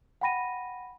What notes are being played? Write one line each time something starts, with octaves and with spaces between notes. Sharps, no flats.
F#5 G5 B5 A#6 D#7